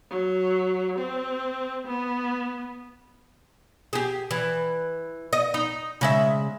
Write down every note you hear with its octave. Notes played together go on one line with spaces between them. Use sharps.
F#3
C4
B3
G4 G#4
E3
D#5
D#4
C#3 G#3 E5